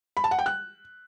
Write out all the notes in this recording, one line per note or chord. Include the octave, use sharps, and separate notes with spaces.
B5
A5
F#5
G5
F#6